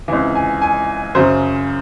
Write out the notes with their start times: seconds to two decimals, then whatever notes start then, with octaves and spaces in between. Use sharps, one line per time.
0.08 C#2 C3 E3 E5
0.35 G#5
0.62 G#5
1.15 F#2 C#3 F#3 C5